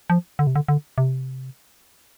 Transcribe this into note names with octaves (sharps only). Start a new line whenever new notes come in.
F3
D3
C3
D3
D3
C3